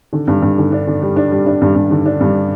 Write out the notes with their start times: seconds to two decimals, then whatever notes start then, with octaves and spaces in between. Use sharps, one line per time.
0.13 D3
0.28 G2
0.42 G2
0.58 D3
0.72 D4
0.87 D3
1.02 G3
1.16 D4
1.32 G3
1.46 D4
1.62 G2
1.75 G2
1.91 D3
2.06 D4
2.21 G2